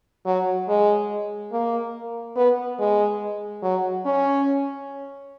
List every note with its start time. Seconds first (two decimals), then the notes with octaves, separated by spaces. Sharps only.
0.26 F#3
0.68 G#3
1.52 A#3
2.36 B3
2.79 G#3
3.62 F#3
4.06 C#4